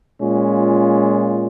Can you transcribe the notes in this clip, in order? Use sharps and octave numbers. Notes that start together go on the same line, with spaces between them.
A#2 G#3 C#4 F4